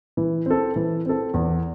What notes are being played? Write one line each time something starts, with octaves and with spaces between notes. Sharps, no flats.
E3
C4 A4
E3
C4 A4
E2